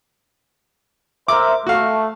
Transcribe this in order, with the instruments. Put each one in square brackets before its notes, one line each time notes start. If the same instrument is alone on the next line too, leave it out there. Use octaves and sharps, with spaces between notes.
[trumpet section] A#4 C5 E5 [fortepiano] D6
[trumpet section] A3 [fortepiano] F#4 F5